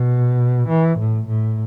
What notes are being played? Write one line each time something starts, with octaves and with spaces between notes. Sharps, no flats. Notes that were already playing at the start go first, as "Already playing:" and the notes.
Already playing: B2
E3
A2
A2